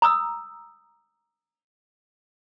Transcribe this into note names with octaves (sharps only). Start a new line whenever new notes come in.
A#5 D#6 E6